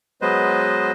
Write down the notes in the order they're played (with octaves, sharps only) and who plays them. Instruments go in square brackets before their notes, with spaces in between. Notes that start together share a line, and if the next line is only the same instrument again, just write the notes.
[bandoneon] F#3 G#3 B3 B4 C5 D#5